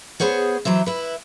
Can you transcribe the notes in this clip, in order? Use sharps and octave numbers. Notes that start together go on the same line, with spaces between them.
B3 G#4 C5 C#5 F#5
E3 F#3 C5 E5
E4 B4